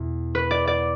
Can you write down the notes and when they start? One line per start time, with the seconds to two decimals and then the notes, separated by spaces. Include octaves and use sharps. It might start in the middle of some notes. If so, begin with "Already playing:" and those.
Already playing: E2 B2
0.35 B4
0.51 D5
0.67 D5